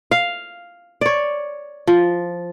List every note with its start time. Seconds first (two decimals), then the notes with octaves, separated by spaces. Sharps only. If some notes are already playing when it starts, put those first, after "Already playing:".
0.11 F5
1.01 C#5 D5
1.87 F3